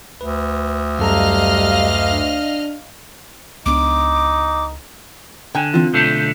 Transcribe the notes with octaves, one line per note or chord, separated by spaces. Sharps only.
D2 B4
F#2 G3 A4 D#5 F5 A#5 F6
D4
C#2 B3 D4 D#4 D6
D3 G5 G#5
E3 C4 F4
B1 D3 A3 G6